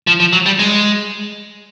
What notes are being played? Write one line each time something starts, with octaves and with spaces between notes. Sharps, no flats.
F3
F3
F#3
G3
G#3